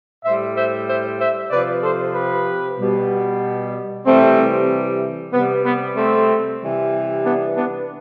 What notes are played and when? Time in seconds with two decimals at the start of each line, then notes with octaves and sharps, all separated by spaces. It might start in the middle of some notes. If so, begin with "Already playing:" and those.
0.24 A2 G3 C5 E5
0.55 C5 E5
0.88 C5 E5
1.19 C5 E5
1.51 C3 F3 B4 D5
1.83 A4 C5
2.15 G4 B4
2.79 B2 G3
4.06 C3 E3 G3 A3 C4
5.33 C3 G3 B3
5.65 B3
5.96 A3 C4
6.60 C3 E3 G3
7.25 B3 D4
7.56 B3 D4